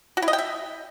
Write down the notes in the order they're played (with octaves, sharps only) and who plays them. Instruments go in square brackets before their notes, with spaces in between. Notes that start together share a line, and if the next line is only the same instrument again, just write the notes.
[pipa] F#4
E4
D#5
G5
E5